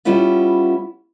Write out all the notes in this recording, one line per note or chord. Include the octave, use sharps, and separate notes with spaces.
G3 B3 C#4 E4 F4